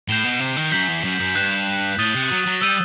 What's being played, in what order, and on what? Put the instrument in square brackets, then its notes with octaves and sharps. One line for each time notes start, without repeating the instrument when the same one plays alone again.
[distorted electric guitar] A2 [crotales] G6 C7 E7 G7
[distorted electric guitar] B2
C3
D#3
[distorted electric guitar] F#2 [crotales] G6 B6 F#7
[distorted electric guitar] E2
F#2
F#2
[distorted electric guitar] G2 [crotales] F#6 B6 E7
[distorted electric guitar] A2 [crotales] D#6 A6 D#7 G7
[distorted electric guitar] C3
F#3
F#3
[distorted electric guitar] G3 [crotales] E6 G6 D#7